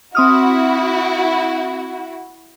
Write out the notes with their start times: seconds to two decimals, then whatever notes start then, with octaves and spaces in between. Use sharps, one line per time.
0.15 C4 E4 F#4 D#6 F6